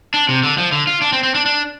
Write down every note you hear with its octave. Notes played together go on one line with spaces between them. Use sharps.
D4
C3
D3
F3
D3
F4
D4
C4
C4
D4
D4